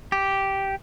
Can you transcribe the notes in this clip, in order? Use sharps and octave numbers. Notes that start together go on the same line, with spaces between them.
G4